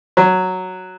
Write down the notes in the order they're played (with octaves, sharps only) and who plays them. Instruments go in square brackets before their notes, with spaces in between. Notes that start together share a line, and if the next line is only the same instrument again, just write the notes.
[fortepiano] F#3